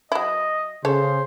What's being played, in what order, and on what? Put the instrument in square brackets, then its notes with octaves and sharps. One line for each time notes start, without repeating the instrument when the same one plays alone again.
[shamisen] F#3 E4 [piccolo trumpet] D#5
[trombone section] C#3 [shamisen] A4 C#5 [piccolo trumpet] C5